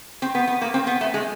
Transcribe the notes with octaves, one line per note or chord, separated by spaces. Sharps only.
C4
B3
B3
A#3
C4
B3
A3
G#3